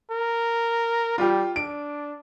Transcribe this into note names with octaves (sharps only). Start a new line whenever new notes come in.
A#4
G3 F4 G4
D4 D7